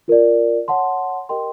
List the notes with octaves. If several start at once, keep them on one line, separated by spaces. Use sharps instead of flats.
F4 A#4 D5
C#5 F#5 A5 C6
G4 A#4 D#5 G5 C6